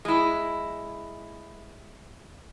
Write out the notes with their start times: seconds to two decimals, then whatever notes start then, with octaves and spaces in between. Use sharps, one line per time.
0.05 G#3 E4